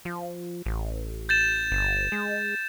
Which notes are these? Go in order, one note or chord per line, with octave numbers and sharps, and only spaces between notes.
F3
A1
G6 A6 E7
G1
G#3